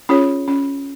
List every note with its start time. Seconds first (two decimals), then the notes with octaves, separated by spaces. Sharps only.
0.09 C#4 F4 G#4 C#5
0.48 C#4